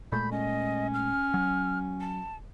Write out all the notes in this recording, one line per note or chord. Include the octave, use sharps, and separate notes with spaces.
A#2 G#3 A3 B5 G6
C#4 D#5
F6
F#3
A5